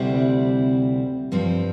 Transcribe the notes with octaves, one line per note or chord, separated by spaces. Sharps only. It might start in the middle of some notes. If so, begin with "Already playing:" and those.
Already playing: D2 C3 G3 C4 E4
G2 F3 C4